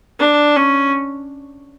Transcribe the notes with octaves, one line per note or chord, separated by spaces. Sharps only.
D4
C#4